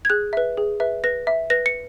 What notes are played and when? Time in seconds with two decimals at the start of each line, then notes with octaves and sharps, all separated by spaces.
0.05 G#6
0.10 G#4 F#6
0.33 B4 E5
0.57 G#4
0.80 B4 E5
1.04 B4 A#6
1.27 E5
1.50 B4 A#6
1.66 C#7